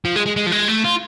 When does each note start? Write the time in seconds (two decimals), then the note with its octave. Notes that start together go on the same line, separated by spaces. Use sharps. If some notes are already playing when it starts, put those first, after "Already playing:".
0.05 F3
0.16 G#3
0.26 G#3
0.36 G#3
0.46 F3
0.52 G#3
0.68 A3
0.84 F4